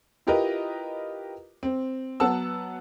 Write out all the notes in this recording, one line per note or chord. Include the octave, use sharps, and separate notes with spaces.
E4 F4 G4 A#4 B4 D#5
C4
F#3 B3 F#5 A5 E6